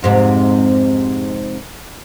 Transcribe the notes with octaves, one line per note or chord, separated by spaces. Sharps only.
F2 G#2 C3